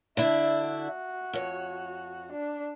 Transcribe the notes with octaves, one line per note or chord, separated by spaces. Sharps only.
D3 D4 E4 E5
F#4
F2 C#5
D4